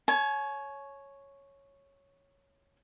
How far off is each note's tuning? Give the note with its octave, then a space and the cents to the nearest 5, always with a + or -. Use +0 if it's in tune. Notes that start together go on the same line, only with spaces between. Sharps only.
C#5 +0 G#5 +40